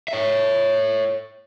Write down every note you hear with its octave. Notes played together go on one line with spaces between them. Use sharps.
C#5 E5